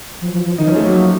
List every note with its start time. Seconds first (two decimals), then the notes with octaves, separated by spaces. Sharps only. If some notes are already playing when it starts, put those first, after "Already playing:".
0.21 F3
0.33 F3
0.46 F3
0.58 D#3 D#4
0.66 F3 F#3 C#4
0.76 A3
0.82 F#3 A#3
0.94 F3